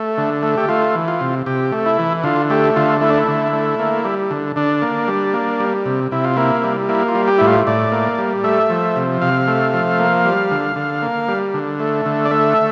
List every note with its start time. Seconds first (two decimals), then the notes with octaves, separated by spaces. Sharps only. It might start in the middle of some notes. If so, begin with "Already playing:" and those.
Already playing: A3
0.18 D3
0.43 A3
0.57 G4
0.69 A3 F4
0.95 E3
1.08 F4
1.21 C3
1.46 C3 G4
1.72 A3
1.86 E4
1.99 E3
2.24 D3 F4
2.50 A3 G4
2.76 D3 F4
3.01 A3 E4
3.10 D4
3.18 E4
3.28 D3
3.53 A3
3.79 A#3
4.05 G3
4.31 D3
4.56 D3 D4
4.82 A#3
5.08 G3
5.34 A#3
5.60 G3
5.86 C3
6.12 C3 E4
6.24 F4
6.36 A#3 E4
6.64 G3
6.89 A#3 E4
7.08 F4
7.15 G3
7.28 G4
7.38 A2 E4
7.47 F4
7.67 A2 D5
7.92 A#3
8.18 G3
8.44 A3 E5
8.70 F3
8.96 C3
9.22 C3 F5
9.48 A3
9.74 F3
9.99 A#3
10.25 G3
10.51 D3
10.76 D3
11.02 A#3
11.28 G3
11.54 D3
11.80 A3
12.06 D3
12.25 D5
12.31 A3 E5